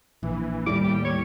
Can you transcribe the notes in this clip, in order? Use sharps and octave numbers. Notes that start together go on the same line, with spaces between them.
A#1 E3
D#2 A2 G3 D6
G4
C#5